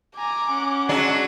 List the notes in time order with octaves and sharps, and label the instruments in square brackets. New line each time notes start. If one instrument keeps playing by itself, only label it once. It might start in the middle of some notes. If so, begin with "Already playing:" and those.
[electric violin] G#5 A#5 [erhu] D6
[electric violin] C#4 F#5
[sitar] F#3 G#3 D4 [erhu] F#4